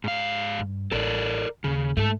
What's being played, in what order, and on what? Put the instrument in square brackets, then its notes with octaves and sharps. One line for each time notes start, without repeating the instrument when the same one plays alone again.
[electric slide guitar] G#2 F5
[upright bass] G2
[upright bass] A1 [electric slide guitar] A4 A#4 D5
[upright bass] D#2 [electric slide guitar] C#3
[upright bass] G#2 [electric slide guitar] A3 A4